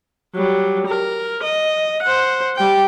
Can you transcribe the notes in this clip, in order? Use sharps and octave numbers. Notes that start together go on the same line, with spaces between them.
F#3 G3
A#4
D#5
C5 F#5
G3 G5